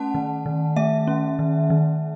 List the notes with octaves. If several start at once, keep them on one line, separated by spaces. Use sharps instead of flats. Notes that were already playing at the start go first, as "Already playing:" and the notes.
Already playing: A3 C#4 F#5 A5
D#3
D#3
A3 E5
C#4
D#3
D#3